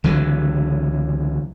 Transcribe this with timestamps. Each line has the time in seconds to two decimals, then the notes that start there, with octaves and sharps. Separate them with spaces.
0.04 C#2 D3 E3 F#3